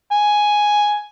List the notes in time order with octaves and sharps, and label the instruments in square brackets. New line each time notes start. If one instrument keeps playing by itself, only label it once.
[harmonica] G#5